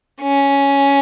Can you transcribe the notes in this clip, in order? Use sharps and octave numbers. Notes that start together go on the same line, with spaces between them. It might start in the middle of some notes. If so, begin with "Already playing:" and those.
C#4